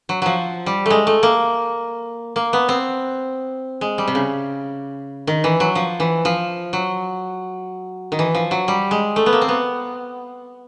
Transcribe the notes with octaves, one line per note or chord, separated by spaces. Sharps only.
F#3
F3 F#3
G3
G#3 A3
A3
A#3
A#3
B3
C4
G#3
G3
C3
C#3
D#3
E3
F#3
F3
E3
F3
F#3
D#3
E3
F3
F#3
G3
G#3
A3
B3
A#3
C4
B3